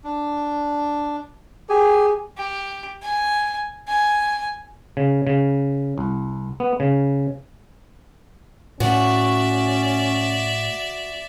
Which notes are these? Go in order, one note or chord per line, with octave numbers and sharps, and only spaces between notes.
D4
G4 G#4 G#5
G4
G#5
G#5
C#3
C#3
C2
B3
C#3
A2 A3 C#4 F#4 D5 E5